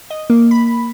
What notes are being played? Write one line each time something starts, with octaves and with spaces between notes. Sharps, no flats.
D#5
A#3
B5